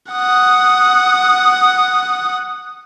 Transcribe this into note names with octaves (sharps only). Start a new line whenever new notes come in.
F#5 D#6